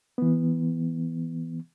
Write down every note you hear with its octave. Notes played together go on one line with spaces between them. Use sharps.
E3 B3